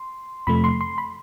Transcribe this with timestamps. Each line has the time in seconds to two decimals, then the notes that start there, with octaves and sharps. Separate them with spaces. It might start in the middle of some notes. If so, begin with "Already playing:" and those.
Already playing: C6
0.47 F2 C3 F3 A3 B5
0.64 C6
0.81 C6
0.98 B5